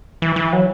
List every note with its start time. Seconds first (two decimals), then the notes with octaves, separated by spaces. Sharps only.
0.22 E3
0.36 E3
0.53 F#3